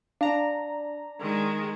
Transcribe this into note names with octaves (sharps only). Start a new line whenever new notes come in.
D4 F5 A#5
D#3 G#3